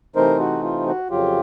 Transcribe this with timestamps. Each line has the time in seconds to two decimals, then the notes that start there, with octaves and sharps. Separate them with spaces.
0.16 C3 E3 A3 C4 D#4 A#4 C5
0.40 F#4
0.63 F4
0.87 F#4
1.10 F2 C#3 F#3 F4 G4